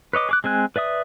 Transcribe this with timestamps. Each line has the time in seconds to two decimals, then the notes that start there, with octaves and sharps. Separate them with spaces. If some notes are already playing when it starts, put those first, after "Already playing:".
0.13 B4 C#5 D#5 D6
0.29 G#4 D6 F#6
0.44 G#3 C4 G#5 F#6
0.76 B4 D5 E5 D#6